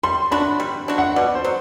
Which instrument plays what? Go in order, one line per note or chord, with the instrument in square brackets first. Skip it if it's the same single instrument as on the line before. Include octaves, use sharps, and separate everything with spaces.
[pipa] G3 [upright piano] C6
[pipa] D4 F#4 [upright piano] B5
[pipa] G3
D4 F#4
[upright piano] F#5
[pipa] B2 [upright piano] D5
[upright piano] C5
[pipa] F#3